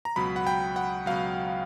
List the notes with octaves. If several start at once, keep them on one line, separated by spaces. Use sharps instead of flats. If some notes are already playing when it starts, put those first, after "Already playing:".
A#5
C#2 B2 F#3 B5
F#5
G5
F#5
C#2 B2 F#3 F5